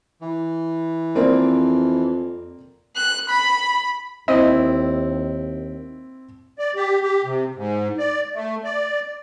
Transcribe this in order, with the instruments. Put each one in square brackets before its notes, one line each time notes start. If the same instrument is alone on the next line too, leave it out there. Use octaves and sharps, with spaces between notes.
[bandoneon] E3
[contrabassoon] F2 [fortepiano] A#3 C4 D5
[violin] F#6
B5
[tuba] D#2 [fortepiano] C4 E4 [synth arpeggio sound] D#5
[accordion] D5
G4
G4
C3
G#2
D5
A3
D5